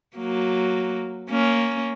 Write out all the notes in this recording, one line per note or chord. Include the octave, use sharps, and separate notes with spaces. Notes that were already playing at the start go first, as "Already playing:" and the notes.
F#3 A#3
A#3 C#4